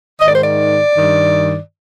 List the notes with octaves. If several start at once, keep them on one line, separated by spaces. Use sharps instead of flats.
G#2 D#3 D#5
D5
C5
D5
G2 D#3